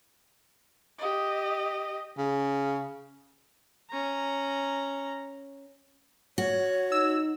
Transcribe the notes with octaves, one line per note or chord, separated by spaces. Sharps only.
G4 D#5
C#3
C#4 A#5
F#4 C#5
D#4 E6